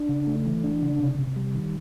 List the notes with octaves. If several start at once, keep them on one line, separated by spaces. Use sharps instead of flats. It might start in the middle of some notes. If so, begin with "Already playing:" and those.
Already playing: D4
C#3
A3
E3
D4
C#3
C3
C3
G3
D#3